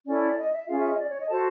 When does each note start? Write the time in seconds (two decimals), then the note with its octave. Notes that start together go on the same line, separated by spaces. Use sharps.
0.06 C#4 E4 A4 D5
0.37 D#5
0.52 E5
0.67 C#4 F4 G#4 F5
0.78 E5
0.88 D#5
0.99 D5
1.09 C#5
1.19 D#5
1.29 F#4 A4 C5 A5